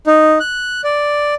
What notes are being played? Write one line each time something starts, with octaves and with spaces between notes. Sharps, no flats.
D#4
F#6
D5